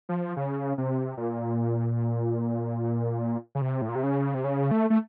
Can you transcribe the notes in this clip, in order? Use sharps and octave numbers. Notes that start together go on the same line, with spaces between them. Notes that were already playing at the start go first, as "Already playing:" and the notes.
F3
C#3
C3
A#2
C#3
C3
A2
A#2
C3
C#3
C3
C#3
A3
A3